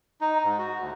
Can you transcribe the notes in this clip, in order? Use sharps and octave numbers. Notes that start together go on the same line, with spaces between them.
D#4
G#2
F#4
D2